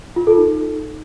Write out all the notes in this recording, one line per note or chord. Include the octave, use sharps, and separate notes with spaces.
F4
A4
D#4